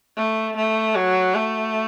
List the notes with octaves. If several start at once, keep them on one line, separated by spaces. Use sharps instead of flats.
A3
A3
F#3
A3